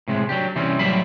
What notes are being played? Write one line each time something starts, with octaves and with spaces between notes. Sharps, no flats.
A2 C3 G#3
F#3 D4 G4
C3 E3 G3 C4 C#4
A2 F#3 G3 C5 E5 B5